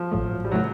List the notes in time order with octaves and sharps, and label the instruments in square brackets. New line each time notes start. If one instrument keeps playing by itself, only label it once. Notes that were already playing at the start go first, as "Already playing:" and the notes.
Already playing: [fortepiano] F3
[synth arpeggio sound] A1 A2 F#3 A3
[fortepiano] G3
[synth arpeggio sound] C#3 E3 A3 [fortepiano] F#3